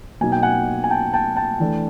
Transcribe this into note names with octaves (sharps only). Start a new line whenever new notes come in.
B2 F#3 A#3 D#4 G#5
G5
F#5 G#5
G#5
G5 A5
G5 A5
G5 A5
E3 A3 D4